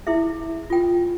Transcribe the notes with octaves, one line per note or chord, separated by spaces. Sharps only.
E4 G#4 E5
F4 G5